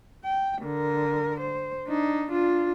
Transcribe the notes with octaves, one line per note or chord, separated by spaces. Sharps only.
G5
D3 A#4
C5
D4 D#4
D4 F4